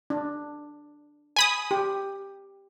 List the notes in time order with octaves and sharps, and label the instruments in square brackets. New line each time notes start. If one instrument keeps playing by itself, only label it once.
[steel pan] D4
[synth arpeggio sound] G#5 B5 D#6
[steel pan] G4